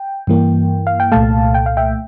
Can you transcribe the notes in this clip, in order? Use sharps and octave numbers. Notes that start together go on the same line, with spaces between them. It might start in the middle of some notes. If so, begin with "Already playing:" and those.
Already playing: G5
G2 E3 A#3
F5
G5
C2 A#2 A3 F5 A5
G5
F5
E5 G5